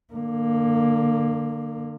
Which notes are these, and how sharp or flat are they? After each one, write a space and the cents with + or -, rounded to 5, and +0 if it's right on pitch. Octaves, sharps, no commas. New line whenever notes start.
D3 +30 A#3 +0